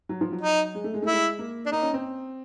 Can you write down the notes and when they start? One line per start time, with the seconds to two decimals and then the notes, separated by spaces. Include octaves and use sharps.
0.09 F#3
0.21 F3
0.32 F#3
0.41 D#4
0.75 G#3
0.84 A3
0.94 G#3
1.02 A3 E4
1.13 G#3
1.39 A#3
1.66 D4
1.72 A#3 D#4
1.82 C#4
1.94 C4